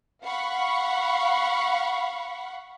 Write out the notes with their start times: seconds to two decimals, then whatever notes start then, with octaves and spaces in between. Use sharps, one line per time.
0.24 F5 F#5 B5 C#6